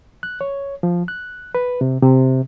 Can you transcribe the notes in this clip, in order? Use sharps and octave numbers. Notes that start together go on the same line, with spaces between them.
F#6
C#5
F3
F#6
B4
C3
C3